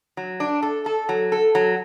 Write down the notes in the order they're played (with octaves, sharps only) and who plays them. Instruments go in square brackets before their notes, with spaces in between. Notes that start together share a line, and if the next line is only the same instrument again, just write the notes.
[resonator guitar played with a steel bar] F#3
D4
A4
A4
F#3
A4
F#3